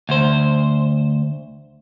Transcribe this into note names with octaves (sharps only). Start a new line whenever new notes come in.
D2 C5